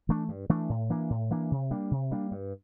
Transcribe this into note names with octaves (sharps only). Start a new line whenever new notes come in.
E3 A3 D4
G2
E3 A3 D4
A2
E3 A#3 D4
A2
E3 A#3 D4
C3
G3 A#3 D4
C3
G3 A#3 D4
G2